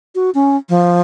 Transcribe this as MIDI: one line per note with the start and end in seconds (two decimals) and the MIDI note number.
0.15 0.30 66
0.34 0.56 61
0.69 1.01 53